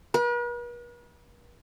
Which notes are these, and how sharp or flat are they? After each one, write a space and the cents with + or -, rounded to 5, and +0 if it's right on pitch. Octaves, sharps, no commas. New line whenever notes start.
B4 -45